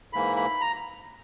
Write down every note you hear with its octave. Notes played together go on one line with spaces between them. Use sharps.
G#2 E3 A#3 B5
B5
A#5